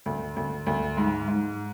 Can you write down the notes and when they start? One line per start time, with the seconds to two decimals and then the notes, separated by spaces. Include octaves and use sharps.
0.06 D2
0.36 D2
0.67 D2
0.97 G#2
1.28 G#2